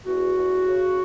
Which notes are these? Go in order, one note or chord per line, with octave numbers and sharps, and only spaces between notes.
E2 F#4
E2
C#3